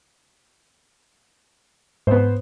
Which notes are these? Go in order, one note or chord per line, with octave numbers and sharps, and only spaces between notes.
G#2 B3 C5